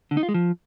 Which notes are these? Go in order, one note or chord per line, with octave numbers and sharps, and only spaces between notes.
D3
D#4
F4
G#3
F3